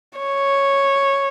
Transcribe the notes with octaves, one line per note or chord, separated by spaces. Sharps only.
C#5